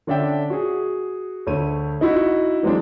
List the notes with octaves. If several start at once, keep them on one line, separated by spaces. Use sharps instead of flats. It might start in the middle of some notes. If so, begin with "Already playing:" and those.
D3 C#4 D4 D5 E5 G5
F#4 G#4
D2 A3 C#5 D#7
D#4 E4 F#4
E3 F#3 G#3 C4 D4